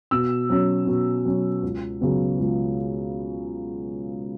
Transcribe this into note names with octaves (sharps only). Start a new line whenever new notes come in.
B2 E6
F#3 C#4
B2
F#3 C#4
C#2
C#3 F#3 B3
C#2